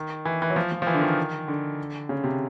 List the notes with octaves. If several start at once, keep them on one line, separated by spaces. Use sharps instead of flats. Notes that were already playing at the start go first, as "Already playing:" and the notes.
Already playing: D#3
E3
E3
F#3
F3
F3
F3
E3
D3
D#3
D3
C#3
C3